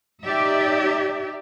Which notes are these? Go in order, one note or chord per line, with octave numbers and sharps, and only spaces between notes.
D#4 G4 D5 E5